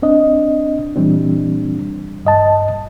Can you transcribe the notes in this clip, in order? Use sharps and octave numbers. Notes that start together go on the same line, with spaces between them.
C4 D4 D#5
A#2 E3 G3 C4 D4
G2 D#5 A5